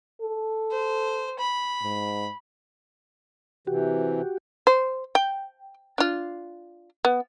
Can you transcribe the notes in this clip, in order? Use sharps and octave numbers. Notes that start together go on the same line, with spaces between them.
A4
C5
B5
G#2
C3 E3 F#4 G4
C5
G5
D4 F4
B3